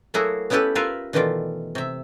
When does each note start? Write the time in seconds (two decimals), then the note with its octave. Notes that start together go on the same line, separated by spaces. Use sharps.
0.14 F#3 A3 A#3 E4 F#4 G#4
0.50 B3 C#4 E4 G4 A4 B4
0.75 F4 A#4 B4 E5 F5
1.13 B2 D#3 E3 A3 F4 D5
1.75 C3 E5